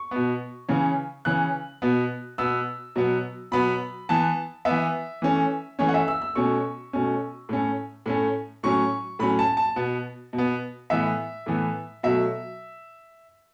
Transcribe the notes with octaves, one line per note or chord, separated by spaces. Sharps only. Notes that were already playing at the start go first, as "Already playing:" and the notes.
Already playing: C#6
B2 B3
C#3 E3 C#4
C#3 E3 C#4 F#6
B2 B3
B2 B3 E6
B2 F#3 B3
B2 F#3 B3 B5
E3 B3 A5
B3 E5
E3
E3 A3 C#4
E3 A3 C#4 C#5
F#5
E5
E6
E6
B2 A3 C#4 C#6
B2 A3 C#4
A2 A3 C#4
A2 A3 C#4
A2 F#3 C#4 C#6
A2 F#3 C#4 B5
A5
A5
B2 B3
B2
B3
A2 E3 B3 E5
A2 E3 B3
B2 F#3 A3 E5